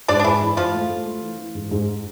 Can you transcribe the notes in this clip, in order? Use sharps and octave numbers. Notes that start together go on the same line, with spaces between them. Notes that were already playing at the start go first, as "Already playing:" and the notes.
G#2 D4 D5
D4
G#2 E3 E4
E3
G#2 F3 F4
A3
A3
A3
E3
E3
G#2
G#2